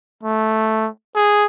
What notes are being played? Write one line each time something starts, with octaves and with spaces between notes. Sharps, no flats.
A3
G#4